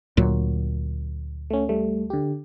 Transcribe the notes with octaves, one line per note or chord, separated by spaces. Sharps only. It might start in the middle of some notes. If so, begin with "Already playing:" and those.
D2 A#2 F#3
A3 C#4
G3 A3
D3 G4